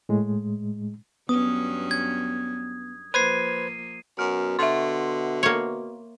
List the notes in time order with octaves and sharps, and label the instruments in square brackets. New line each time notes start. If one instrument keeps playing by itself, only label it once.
[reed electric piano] A2 G#3
[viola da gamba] G2 F#3 C#4 [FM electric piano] B3 [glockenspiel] D#6
[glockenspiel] G#6
[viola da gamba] F3 A#3 [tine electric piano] B4 C5 G#6 [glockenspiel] C7 D#7
[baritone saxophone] F#2 [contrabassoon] B2 [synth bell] F6
[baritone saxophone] D3 [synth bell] E5 C6
[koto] A#3 C#5